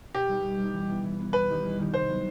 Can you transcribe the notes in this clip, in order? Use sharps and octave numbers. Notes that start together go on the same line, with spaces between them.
B2 G4
G3 D#4
B2
G3 D#4
E3
B3 E4
E3
B3 E4
E2 B4
D#3 G3 D#4 G4
E2
D#3 G3 D#4 G4
C3 C5
F#3 B3 F#4